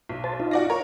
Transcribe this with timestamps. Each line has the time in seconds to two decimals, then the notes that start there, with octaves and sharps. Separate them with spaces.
0.09 B1
0.24 C5 A5
0.40 D#4 F4
0.51 F#4 D5 A#6
0.70 A#4 C#5